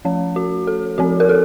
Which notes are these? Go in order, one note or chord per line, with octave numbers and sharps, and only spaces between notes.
F3 A3 C#4
F#4
A4
F3 C4 F#4
A#4
A4